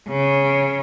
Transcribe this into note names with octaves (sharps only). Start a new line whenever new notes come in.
C#3